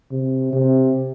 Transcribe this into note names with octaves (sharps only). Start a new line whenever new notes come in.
C3
C3